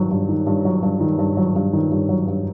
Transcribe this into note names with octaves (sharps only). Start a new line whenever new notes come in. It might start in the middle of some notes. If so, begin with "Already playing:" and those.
Already playing: G2 D#3 F#3
G2
D#3
G2
F#3
G2
D#3
G2
F#3
G2
D#3
G2
F#3
G2